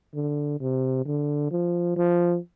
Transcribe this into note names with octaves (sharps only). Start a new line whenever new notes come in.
D3
C3
D3
F3
F3